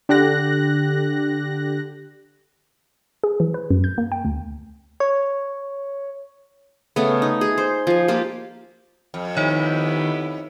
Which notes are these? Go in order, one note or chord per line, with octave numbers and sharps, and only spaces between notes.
D3 G4 F#6 A#6
G#4
E3
B4
F#2
G6
A#3
G5
D2
C#5
C#3 A3 B3
D#4
G#4
C5
F3 G#5
A#3 F4 G4
F2
D#3 B3 D#4 E4 G4 C#5